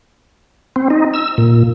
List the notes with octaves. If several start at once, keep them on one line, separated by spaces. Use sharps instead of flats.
C4
D#4
E6
A#2